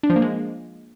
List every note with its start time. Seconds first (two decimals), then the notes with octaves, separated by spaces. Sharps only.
0.03 D4
0.10 F3
0.16 A#3
0.22 G#3